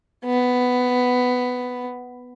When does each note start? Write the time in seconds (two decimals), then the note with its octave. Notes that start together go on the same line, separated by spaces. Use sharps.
0.25 B3